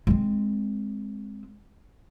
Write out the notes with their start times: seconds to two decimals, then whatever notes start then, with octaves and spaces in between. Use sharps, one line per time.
0.07 G#3 C4